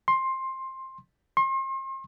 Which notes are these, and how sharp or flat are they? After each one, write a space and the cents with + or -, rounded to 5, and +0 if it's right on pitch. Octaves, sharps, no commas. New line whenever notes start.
C6 +15
C6 +40